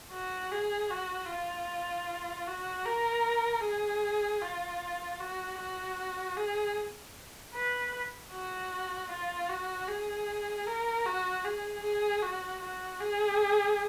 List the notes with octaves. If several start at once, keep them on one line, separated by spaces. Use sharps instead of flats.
F#4
G#4
F#4
F4
F#4
A#4
G#4
F4
F#4
F#4
G#4
B4
F#4
F4
F#4
G#4
A#4
F#4
G#4
G#4
F#4
F#4
G#4